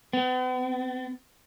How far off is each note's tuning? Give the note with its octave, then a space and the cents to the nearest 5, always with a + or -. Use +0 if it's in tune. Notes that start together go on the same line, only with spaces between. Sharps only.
B3 +45